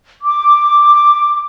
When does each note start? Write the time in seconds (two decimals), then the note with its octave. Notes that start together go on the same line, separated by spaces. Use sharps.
0.23 D6